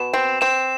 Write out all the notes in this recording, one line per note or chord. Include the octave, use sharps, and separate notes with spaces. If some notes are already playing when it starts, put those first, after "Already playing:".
Already playing: B2 E7
C4
C4 E7